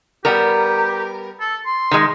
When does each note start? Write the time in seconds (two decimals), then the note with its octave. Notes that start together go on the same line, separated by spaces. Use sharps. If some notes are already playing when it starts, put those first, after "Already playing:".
0.25 G3 B3 G4 A#4
1.40 A4
1.66 C6
1.91 D#3 G#3